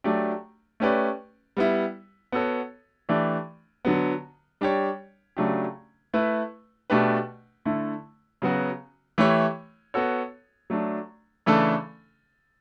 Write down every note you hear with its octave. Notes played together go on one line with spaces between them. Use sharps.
F#3 A3 D4 G4 D5
A3 C#4 G4 B4 D5
G3 B3 E4
B3 F#4 A4 C#5
E3 A3 D4 G4 D5
D3 F#3 B3
G3 D4 G4 C#5
C#3 F#3 A3 D4 G4
A3 E4 B4
B2 A3 D4 G4 B4
D3 A3 E4
C#3 F#3 B3 F#4
E3 A3 E4 G4 C#5
B3 F#4 A4 C#5
F#3 A3 D4
C#3 E3 A3 D4 A4